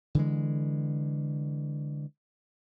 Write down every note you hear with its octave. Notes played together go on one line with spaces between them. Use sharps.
D3 E3 G#3